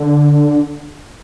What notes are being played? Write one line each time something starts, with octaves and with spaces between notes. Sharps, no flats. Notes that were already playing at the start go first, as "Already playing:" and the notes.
Already playing: D3